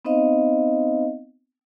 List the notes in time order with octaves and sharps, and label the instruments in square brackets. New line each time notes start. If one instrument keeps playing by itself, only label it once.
[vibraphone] B3 C4 D#4 C5 D#5 F5